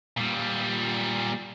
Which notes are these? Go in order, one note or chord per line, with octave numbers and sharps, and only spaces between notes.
A#2 G3